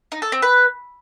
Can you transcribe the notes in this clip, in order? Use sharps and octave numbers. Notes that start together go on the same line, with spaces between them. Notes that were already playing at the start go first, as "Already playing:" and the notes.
D#4
A4
C4
B4